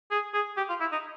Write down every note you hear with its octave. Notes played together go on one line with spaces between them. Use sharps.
G#4
G#4
G4
F4
E4
D#4